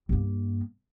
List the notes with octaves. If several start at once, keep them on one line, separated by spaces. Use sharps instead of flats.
G2 A#3